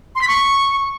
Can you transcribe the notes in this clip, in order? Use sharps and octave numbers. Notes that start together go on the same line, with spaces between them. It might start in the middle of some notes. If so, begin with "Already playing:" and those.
C6
B6
C#6